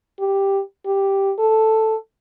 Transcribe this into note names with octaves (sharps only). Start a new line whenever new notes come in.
G4
G4
A4